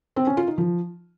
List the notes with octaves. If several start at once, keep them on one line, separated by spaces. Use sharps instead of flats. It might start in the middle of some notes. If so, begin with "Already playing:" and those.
C4
C#4
F4
D#4
F3